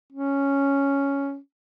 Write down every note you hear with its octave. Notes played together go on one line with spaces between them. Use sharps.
C#4